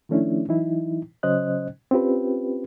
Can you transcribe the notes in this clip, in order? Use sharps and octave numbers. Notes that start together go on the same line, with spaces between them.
D#3 F3 A3 C#4 D4 E4
E3 F#3 D#4 E4
C#3 F#3 C#4 C5 D#5 F#6
C4 C#4 F4 G4 B4